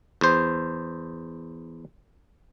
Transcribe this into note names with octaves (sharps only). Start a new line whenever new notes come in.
E2 C5